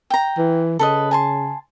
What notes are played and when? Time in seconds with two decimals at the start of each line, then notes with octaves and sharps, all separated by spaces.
0.10 G5 A#5
0.38 E3
0.79 C#3 A4 B4 D#5
1.11 G#5 A5 C6